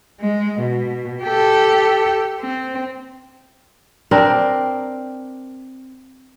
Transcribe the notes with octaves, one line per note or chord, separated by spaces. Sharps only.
G#3
B2
G4 A4
C4
C4 D4 A#4